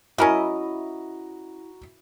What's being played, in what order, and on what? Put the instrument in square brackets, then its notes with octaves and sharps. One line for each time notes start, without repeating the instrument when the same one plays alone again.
[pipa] C#4 A#4 D#5 [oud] E4 [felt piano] F#4 A#5